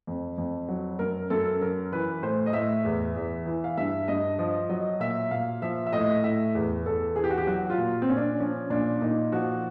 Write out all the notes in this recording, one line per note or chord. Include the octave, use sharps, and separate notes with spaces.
F2
F2
F#3
F#2 A#4
F#2 A4
F#3 A#4
E3 B4
A2 C5
D#5
A2 E5
E2
E2
E3
F5
G2 E5
G2 D#5
F3 D#5
F#3 D#5
A#2 E5
A#2 F5
F3 E5
E5
A2 D#5
A2 E5
E2
E2 A4
E3 G#4
G4
F#4
G4
F#3 F#4
F4
A#2
C4
A#2 C#4
D4
F3 C#4
A#2 D4
A#2 D#4
F3 F#4